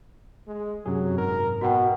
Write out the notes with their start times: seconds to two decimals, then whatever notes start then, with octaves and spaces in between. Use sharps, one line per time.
0.47 G#3
0.86 F#2 C3 F#3 G#4
1.18 G#2 A#4
1.61 B2 F#4 F#5 G5